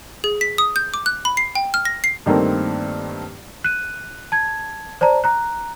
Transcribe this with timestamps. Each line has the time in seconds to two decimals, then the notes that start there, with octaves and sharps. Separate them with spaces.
0.24 G#4
0.41 B6
0.58 D#6
0.76 G6
0.94 D6
1.06 F#6
1.25 B5
1.37 C7
1.55 G5
1.74 F6
1.85 A#6
2.04 C7
2.26 G2 D#3 A3 A#3 C4
3.64 F#6 D#7
4.32 A5 G#6
5.01 C5 D5 A5 A#5
5.24 A#5 F#6